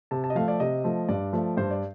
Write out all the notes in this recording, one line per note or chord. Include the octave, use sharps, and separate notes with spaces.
C3 A5
A5
D#5
F3 A3 F5
D5
C3 D#5
F3 A3
G2 D5
F3 A3
G2 C5
D5